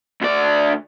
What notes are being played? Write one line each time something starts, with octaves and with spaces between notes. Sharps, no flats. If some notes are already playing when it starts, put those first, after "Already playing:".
D2 D5